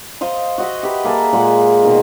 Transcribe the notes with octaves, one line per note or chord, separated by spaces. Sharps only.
C5 D#5 F5 C6
F#4 D#5 E5
G4 B4
A#3 G#4 A4
A#2 G#3 F#5
B2 D#3 C6